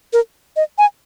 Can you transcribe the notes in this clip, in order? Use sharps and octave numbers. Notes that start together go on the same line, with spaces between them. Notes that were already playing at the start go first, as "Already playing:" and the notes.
A#4
D#5
G#5